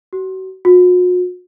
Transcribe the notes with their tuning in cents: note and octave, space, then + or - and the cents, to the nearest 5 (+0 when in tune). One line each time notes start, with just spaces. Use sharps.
F#4 +35
F#4 -45